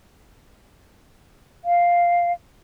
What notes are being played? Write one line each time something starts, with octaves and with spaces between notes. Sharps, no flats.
F5